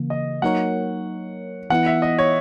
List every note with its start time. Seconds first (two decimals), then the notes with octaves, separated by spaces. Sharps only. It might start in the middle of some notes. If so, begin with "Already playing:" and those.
Already playing: C#3 E3 A#3
0.10 D#5
0.42 F#3 A#3 D#4 A#4 C#5 F#5
1.70 E3 B3 E4 F#5
1.86 E5
2.02 D#5
2.19 C#5